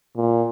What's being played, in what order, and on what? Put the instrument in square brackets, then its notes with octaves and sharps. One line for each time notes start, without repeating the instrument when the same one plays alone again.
[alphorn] A#2